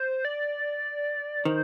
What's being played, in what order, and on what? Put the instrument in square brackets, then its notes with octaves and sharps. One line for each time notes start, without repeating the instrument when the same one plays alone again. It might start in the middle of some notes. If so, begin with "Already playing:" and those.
Already playing: [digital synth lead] C5
D5
[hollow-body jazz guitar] D#3 [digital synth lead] C5